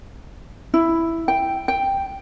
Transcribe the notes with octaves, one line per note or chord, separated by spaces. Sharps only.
E4
G5
G5